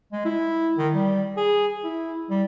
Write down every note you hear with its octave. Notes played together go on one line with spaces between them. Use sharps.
G#3
E4
D#3
G3
G#4
E4
G3